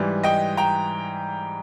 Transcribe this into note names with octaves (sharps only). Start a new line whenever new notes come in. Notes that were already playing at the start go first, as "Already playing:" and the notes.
Already playing: G#2 E3 G3
D#5 G5
G5 A#5